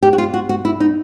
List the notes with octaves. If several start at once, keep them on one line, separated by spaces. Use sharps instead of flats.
G4
F#4
F4
F#4
F#4
E4
D#4